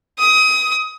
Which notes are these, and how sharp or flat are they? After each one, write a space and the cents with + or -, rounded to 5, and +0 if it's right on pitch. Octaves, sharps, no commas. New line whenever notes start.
D#6 +25